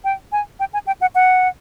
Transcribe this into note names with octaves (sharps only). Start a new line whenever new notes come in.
G5
G#5
G5
G#5
G5
F#5
F#5